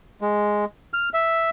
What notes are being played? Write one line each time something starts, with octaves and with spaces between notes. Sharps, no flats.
G#3
F6
E5